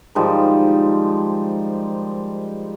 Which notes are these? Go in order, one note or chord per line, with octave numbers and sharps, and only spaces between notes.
G#2 D#3 F3 G3